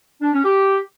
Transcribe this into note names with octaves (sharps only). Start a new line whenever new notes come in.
D4
C#4
G4